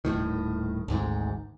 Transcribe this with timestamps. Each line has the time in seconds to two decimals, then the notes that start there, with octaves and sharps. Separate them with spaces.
0.05 D#1 B1 A2 D#3
0.88 G#1 D2 G#2